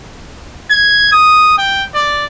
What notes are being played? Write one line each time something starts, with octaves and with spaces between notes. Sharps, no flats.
G#6
D#6
G5
D5